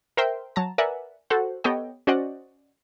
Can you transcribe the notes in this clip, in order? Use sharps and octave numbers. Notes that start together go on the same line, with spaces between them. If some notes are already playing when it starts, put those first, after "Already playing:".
A#4 C5 E5 G5 C6
F#3 A5 A#5
A#4 B4 D5 E5 F#5 G#5
F#4 A4 C5 F#5
B3 G4 A4 C#5 D#5 G5
C#4 F#4 C5 D5 D#5 F#5